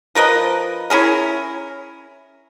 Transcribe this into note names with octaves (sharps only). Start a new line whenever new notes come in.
F3 A#4 B4 D#5
C#4 E4 G#4 A#4